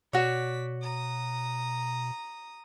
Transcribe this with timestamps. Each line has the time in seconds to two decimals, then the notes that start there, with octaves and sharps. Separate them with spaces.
0.13 B2 F#4 C#5 D5 B6
0.82 A#5 D#6